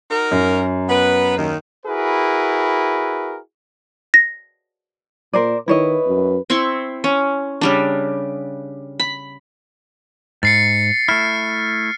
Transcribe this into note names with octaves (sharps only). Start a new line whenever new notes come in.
D#4 F#4 A#4
F#2
B3 B4
D#2 D#3
E4 F#4 G#4 A#4 B4
A#6
A#2 A#4 C5 D5
D#3 E4 B4 C#5 D#5
F#2
C4 E4 C6 C#6
C#4
C#3 G3 D4
B5
G#2 A6 C7 C#7
A3 E4 F6